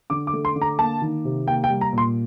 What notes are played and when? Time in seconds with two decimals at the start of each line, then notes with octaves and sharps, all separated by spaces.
0.10 D3 D6
0.27 D6
0.33 A3
0.45 C6
0.56 D3
0.62 A#5
0.79 A#3 A5
1.02 D#3
1.25 C3
1.47 A#3 G5
1.64 G5
1.70 G3
1.81 A#5
1.93 A#2 C6